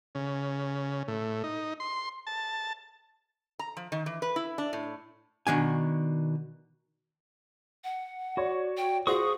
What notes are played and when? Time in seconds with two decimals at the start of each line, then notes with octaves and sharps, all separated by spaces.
0.15 C#3
1.08 A2
1.44 D#4
1.80 C6
2.27 A5
3.59 A#5
3.77 F3
3.92 D#3
4.06 E3
4.22 B4
4.36 E4
4.58 D4
4.73 A2
5.47 B2 D#3 D4 G#5
7.84 F#5
8.37 F#4 C#5 D5
8.77 G5
9.07 F4 F#4 G#4 C5 C#6 D#6